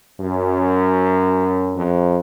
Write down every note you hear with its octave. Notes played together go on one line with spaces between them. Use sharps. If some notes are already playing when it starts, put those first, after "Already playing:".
F#2
F2